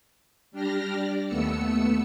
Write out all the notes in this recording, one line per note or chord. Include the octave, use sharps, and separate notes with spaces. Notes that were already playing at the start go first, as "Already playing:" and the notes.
G3 D4 G4 F6 A#6
D5
D#2 A3 B3 E6 C#7